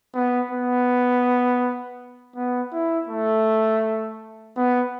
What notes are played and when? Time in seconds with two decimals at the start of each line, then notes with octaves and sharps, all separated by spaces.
0.15 B3
0.51 B3
2.36 B3
2.73 E4
3.09 A3
4.57 B3